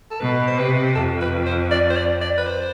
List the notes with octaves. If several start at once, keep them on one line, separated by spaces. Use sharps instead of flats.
A4
B2 B4
C5
C3 B4
F2 A4
B4
C5
D5
C5
D5
D5
B4
C5